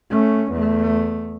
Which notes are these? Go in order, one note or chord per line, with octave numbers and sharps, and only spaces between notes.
A3 C#4
E2 A3